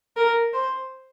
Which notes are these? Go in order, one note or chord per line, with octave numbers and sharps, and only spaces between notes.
A#4
C5